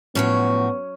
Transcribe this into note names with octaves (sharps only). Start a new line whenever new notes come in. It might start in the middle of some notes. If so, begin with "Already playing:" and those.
A2 F3 F#3 B3 C#4 F#4 C#5